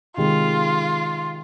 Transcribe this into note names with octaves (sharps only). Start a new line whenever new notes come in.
C3 D#3 G#3 F4